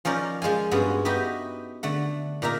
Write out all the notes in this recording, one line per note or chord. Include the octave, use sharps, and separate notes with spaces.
F3 C#4 D#4 A#4 D5
F3 G#3 F5 G#5
G2 G#3 B3 C#4 F#4
B3 D#4 F#4 G4 D#5 E5
D3 A3 F#5
A#2 D#4 A#4 E5 A#5